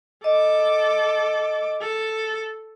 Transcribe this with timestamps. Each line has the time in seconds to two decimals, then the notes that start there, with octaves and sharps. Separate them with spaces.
0.24 A4 D#5 D6
1.81 A4